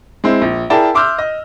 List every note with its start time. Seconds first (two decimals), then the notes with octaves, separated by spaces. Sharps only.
0.24 G#3 C4 E4
0.41 A#1
0.70 E4 G#4 A#4 D5 G5 A5
0.94 E5 C6 D6 E6 F6 G6
1.18 D#5